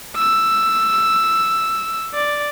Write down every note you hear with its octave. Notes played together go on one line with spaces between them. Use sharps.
E6
D5